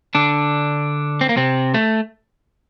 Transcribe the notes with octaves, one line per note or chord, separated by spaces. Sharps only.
D3 D4
C4
A#3
C3 C4
A3